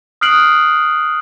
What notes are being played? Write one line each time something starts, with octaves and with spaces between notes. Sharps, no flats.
D#6 F6 F#6 C7 D7 F#7